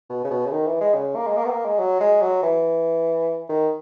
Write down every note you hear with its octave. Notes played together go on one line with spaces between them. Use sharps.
B2
C#3
B2
C#3
D#3
E3
G#3
C#3
A#3
G#3
A#3
B3
A#3
G#3
F#3
G#3
F#3
E3
D#3